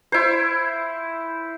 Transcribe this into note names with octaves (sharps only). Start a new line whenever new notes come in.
E4 C5